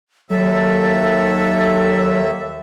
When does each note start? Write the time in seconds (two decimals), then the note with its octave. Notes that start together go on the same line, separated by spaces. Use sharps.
0.30 D#2 F#3 A4 E5